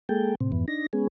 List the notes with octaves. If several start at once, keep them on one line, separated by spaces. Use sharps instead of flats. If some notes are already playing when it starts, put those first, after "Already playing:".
G#3 A#3 G#4 A4 G5
A2 C3 C4
F2 G#2 E3 B3
D4 D#4 A#6
G#3 B3 C#4 G#4